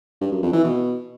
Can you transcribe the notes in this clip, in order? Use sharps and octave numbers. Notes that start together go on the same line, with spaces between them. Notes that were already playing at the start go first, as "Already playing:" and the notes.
G2
F#2
F2
E3
B2